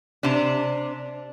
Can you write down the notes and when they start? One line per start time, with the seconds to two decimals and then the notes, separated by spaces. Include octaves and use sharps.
0.23 C3 D4